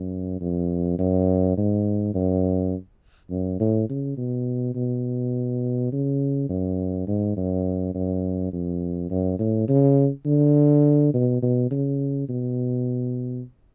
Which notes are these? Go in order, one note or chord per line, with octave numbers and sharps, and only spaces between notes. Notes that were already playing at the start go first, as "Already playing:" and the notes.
Already playing: F#2
F2
F#2
G#2
F#2
F#2
A2
C#3
B2
B2
C#3
F#2
G#2
F#2
F#2
F2
F#2
A2
C#3
D3
B2
B2
C#3
B2